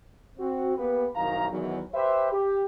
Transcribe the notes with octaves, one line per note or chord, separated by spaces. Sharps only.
C4 F#4
A#3 B3 G4 B4
C2 F#2 D#3 F5 A#5
E2 D#3 F#3
G4 B4 C5 E5
G4